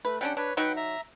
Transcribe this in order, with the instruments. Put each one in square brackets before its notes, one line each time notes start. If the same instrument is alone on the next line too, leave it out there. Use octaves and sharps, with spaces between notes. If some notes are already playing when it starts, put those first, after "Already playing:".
[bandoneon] A3 [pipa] B4
[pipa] G3 C#4 D4 [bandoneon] F#5 G5
[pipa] D4 [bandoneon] B4 C#5
[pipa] F#3 D#4 C#6 [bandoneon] B4 F#5 G5
[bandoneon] E5 A#5